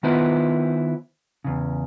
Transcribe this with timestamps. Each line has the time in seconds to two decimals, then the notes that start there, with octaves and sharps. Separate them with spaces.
0.03 D#3 B3 E4 F4 B4 C5
1.45 E2 C#3